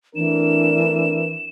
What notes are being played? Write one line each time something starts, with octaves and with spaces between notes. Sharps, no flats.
E3 A3 C4 D4 A#4 E7